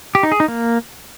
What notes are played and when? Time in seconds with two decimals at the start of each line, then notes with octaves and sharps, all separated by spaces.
0.15 G4
0.23 D#4
0.32 G#4
0.40 D#4
0.48 A#3